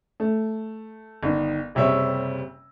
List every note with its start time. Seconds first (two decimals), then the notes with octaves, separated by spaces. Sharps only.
0.20 A3
1.23 G1 D#3
1.75 F#1 C3 G3 C#5 E5